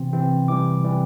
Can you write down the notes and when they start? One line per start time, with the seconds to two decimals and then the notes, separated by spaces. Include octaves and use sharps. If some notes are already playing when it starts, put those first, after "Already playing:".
Already playing: C3 E3 C4
0.13 C3 E3 C4
0.48 C3 E3 G3 D6
0.84 C3 E3 G3